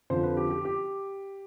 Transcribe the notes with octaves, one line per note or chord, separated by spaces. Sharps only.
F2 D3 F3 C5
B4
G4
G4
G4